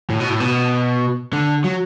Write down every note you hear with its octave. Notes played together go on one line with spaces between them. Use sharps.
A2
B2
A2
B2
D3
F#3